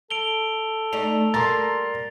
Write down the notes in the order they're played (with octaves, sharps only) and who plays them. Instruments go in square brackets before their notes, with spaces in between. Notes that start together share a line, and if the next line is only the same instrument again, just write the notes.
[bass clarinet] A4 [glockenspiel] D7 F7 G7
[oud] A3 D4 D#4 [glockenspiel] F7
[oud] G3 A#3 [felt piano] A#5 C6 [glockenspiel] A6